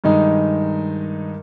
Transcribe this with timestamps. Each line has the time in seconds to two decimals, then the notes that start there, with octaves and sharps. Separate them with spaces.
0.04 G2 D#3 G#3 D#4